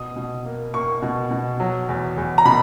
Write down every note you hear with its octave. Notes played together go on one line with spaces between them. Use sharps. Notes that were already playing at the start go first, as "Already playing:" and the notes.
Already playing: B2 D#6
B2
A#3
A#3 C#6
B2
B2
F#3
E2
E2
A#5
B2 B5